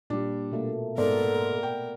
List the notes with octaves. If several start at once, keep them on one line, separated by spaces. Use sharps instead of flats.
A#2 G3 D4
B2 A3 A#3
G#2 B3 A4 A#4 D5
G5